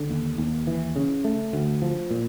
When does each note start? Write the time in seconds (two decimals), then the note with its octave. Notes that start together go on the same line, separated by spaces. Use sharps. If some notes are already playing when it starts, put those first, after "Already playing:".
Already playing: D3
0.10 D#2
0.38 D#2
0.67 E3
0.96 C#3
1.24 A3
1.53 D2
1.82 F3
2.11 A#2